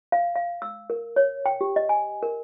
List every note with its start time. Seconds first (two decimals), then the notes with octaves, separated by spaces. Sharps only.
0.12 F5
0.36 F5
0.62 E6
0.90 A#4
1.16 C#5
1.46 G5
1.61 G4
1.76 D#5
1.89 G#5
2.23 A#4